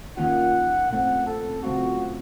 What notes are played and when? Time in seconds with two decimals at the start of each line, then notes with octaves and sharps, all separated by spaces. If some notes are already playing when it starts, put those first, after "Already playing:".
0.17 D#3 A#3 C#4 F4 F#5
0.90 A#2 A3 C4 F#5
1.27 A4
1.62 C#3 F#3 A3 C4 F4 F#4